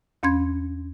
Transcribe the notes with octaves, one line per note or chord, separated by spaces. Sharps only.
E2 C#4 C6 G#6